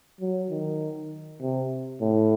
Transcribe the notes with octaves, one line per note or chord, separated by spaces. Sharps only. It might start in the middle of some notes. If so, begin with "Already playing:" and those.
F#3
D#3
C3
A2